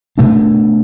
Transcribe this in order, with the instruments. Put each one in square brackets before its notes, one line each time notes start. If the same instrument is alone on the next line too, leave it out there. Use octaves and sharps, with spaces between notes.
[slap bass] B2 A3 D4